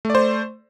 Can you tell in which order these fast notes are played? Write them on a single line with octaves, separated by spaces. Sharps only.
A3 D5 C5